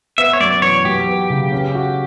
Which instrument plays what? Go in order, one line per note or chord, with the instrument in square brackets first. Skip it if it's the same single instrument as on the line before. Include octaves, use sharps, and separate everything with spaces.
[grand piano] B3 [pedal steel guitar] E5
[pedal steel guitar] C#5
[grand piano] F#2 [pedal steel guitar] D5
[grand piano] E3 [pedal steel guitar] C#5
[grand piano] F#3 [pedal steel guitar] G4
[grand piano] B3
C#3
C#4
F#4